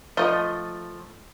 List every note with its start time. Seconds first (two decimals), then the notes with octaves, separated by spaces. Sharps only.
0.17 F3 A3 F4 D#5